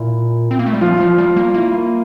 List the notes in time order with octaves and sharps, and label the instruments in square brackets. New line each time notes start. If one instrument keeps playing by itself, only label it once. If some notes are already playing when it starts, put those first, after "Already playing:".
Already playing: [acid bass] A#2 [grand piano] E4
[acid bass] C4
A#3
A3
G3
[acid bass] F3 [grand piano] F4
[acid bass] F3
G3
A#3
[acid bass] A#3 [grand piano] E4